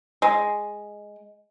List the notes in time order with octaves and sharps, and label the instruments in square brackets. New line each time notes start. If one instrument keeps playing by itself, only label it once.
[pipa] G#3